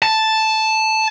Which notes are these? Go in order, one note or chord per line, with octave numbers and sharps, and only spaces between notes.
A5